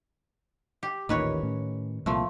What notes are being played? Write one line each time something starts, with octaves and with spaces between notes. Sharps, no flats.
G4
A1 D#2 A#2 D#3 B4 C#5
A2 C#4
C2 A#2 F3 A3